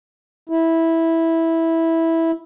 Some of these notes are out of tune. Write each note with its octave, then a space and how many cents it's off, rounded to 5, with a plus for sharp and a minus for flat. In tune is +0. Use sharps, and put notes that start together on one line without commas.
E4 -10